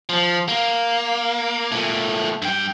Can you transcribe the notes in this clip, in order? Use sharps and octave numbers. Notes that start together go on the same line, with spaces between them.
F3
A#3
A#2 A3
G2 G5